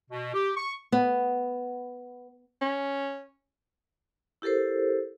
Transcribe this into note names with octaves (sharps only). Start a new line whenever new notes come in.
B2
G4
C#6
B3
C#4
E4 G4 A4 A#4 C5